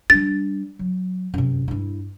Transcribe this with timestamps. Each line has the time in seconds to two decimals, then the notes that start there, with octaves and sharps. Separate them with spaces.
0.10 G3 D4 A6
0.79 F#3
1.34 F#2 C3
1.68 G2 E4